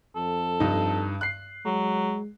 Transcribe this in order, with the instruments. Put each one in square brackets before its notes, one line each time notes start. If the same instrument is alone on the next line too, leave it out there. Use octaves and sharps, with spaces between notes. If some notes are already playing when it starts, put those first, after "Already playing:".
[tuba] F2 [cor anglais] A4
[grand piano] G2 D#4
F#6 C7
[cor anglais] F#3 [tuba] G#3